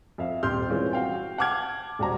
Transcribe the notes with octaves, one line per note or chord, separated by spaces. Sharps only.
F2 E5 F5
D#1 C4 G4 C6 F6 G6
E3 G3 G#3 C4 C#4 F4
F#4 F5 G5
F#5 A5 D6 F6 G#6
D#1 G3 F#4 C5 A#5